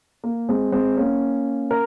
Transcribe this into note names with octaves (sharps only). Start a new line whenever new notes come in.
A#3
G#3 C4
G#3 C4
A#3 C#4
A#4